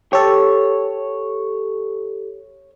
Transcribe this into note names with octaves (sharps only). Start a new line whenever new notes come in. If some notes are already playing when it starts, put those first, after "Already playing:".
G4 A4 C#5